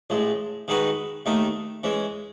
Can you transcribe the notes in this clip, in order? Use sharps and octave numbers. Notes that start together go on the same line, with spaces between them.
A1 A2 G#3
D#3 G#3 D#4 F#4 B4
D#2 D#3 A3 D#4
E3 G#3 C#4